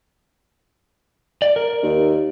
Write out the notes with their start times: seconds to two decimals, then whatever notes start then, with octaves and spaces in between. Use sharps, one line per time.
1.42 D5
1.56 A#4
1.83 D#2